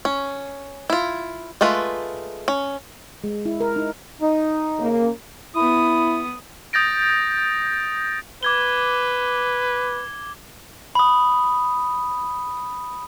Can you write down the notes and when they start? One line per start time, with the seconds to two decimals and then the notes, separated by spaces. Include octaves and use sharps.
0.05 C#4
0.90 E4 F4
1.61 G#3 A3 F4 B4
2.48 C#4
3.24 G#3
3.45 E4
3.61 A#4
3.76 D#4
4.22 D#4
4.79 C#3 A#3
5.55 B3 E4 D#6
6.73 D#6 G6 A6 A#6 D7
8.43 B4 D6 G#6 G7
10.95 B5 D#6